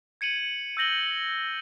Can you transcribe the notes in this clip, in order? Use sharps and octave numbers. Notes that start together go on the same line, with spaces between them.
G#6 C#7 D#7 F#7
E6 G6 A#6 F#7 G7